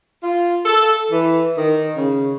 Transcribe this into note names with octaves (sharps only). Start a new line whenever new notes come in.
F4
A4
E3
D#3
C#3